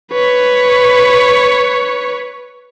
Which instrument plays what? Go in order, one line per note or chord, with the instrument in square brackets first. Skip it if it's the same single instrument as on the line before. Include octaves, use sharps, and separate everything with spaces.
[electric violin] B4 C#5